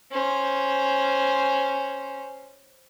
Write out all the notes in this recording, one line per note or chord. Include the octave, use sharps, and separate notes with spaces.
C#4 C5